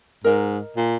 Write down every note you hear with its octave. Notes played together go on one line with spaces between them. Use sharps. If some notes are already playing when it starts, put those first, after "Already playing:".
G#2 A#4 D#5
A#2